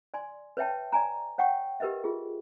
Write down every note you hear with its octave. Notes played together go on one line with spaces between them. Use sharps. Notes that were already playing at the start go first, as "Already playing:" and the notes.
D5 G#5 C6
B4 C#5 E5 G5 A5
D5 G#5 A#5
C#5 F#5 G5 C#6
G4 A#4 B4 D#5 E5
F4 G#4